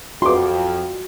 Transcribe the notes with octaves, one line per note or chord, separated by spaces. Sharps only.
F2 F#4 C6 D6